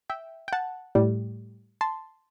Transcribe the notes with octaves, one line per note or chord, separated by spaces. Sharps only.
E5 G5
G5
F#5 A5
A2 G3
A5 C6